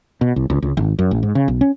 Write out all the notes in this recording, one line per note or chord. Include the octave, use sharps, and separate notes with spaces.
B2
C2
C#2
C#2
G#1
F#2
A1
G#2
C#3
B1
C#4